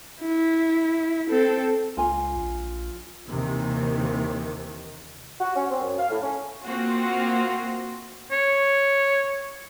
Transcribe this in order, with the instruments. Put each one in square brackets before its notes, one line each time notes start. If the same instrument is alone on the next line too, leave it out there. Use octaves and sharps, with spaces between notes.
[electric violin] E4
C4 A4
[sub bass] C#2 [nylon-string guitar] F4 G#5
[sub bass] A#1
[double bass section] D#2 C3 D#3 E3
[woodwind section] F#4
C#4
C4
F#2
F5
A2
C#4
[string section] A#3 C4 F4 F#4
[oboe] C#5